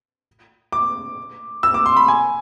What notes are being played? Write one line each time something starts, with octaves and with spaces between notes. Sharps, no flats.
D6
E6
D6
C6
B5
G#5